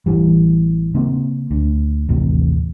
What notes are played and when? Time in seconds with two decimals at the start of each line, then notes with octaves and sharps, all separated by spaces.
0.06 A1 E3 G3
0.94 C#3 A#3 C4
1.51 D2
2.09 A1 D#2 C3